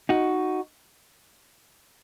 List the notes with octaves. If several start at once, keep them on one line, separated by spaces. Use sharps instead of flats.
D#4 F#4